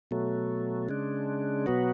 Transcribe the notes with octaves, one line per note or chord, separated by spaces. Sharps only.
B2 F#3 A3
C#3 G#3 D4
B2 F#3 B3 F#4